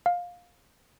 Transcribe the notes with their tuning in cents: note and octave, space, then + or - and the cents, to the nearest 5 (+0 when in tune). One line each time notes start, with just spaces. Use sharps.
F5 +15